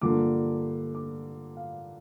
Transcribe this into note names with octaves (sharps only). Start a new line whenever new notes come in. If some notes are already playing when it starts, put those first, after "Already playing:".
G2 D3 F3 A#3 D6
D6
F5